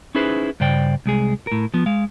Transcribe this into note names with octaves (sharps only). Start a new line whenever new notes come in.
C#4 D#4 E4 G#4 B4 C5
G2 C#3 C5 D5 G5
C2 G#3 G#4
A2 A#4
F3 B3
G#3 F5